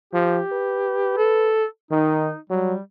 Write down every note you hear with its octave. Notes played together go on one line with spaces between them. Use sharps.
F3 G4
B4
A4
D#3 D#4
F#3 G3